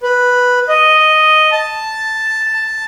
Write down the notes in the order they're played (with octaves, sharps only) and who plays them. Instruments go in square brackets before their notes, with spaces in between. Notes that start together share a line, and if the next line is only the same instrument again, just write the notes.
[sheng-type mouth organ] B4
D#5
A5